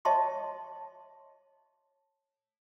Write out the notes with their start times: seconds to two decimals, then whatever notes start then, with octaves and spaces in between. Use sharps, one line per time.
0.05 C#5 D#5 E5 A5 C6 C#6